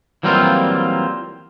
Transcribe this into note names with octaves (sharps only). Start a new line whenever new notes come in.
E3 F#3 G3 A#3 C4 F4